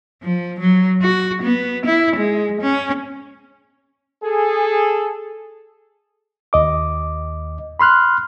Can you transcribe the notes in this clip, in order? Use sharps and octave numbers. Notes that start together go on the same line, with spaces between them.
F3
F#3
F#4
B3
E4
G#3
C#4
G#4 A4
D#2 D#5 D6
B5 C6 F6 F#6